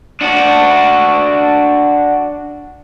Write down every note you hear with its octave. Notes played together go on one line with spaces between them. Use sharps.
D4 F#4